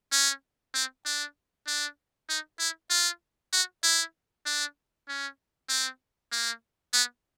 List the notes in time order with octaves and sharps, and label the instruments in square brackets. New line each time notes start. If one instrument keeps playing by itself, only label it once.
[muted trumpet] C#4
C4
D4
D4
D#4
E4
F4
F#4
E4
D4
C#4
C4
A#3
B3